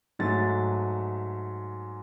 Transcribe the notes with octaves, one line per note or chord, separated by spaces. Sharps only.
G#2 F#3 A3 A6